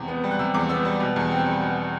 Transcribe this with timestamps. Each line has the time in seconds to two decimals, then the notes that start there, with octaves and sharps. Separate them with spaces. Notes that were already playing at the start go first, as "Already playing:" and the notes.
Already playing: E2 C3
0.08 B3
0.24 G3
0.31 F#6
0.39 C3 E6
0.54 E2 D6
0.69 B3 E6
0.85 G3
1.00 B2
1.16 E2
1.32 C4
1.47 G3
1.61 B2